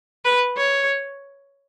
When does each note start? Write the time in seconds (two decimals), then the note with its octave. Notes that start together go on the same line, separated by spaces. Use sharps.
0.25 B4
0.57 C#5